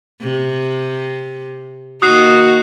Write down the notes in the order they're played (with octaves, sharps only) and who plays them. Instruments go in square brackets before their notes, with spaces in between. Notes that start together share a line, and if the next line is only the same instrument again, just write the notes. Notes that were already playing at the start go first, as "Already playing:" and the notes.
[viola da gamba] C3
[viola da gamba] D#3 A#3 D#4 [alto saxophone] F#4 [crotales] D#6 F#6 C7